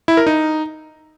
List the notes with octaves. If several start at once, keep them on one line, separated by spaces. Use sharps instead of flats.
E4
A#4
D#4